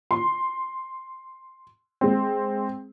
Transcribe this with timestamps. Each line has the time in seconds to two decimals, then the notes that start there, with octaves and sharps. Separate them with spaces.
0.11 C6
2.01 G#3 C4